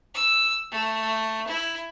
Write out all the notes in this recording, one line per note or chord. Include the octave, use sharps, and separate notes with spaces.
E6
A3
E4